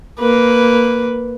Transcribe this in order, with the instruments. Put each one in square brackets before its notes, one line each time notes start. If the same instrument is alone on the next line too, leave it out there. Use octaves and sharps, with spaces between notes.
[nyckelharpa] A#3 B4